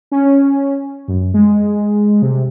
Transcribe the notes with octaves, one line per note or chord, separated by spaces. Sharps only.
C#4
F#2
G#3
C3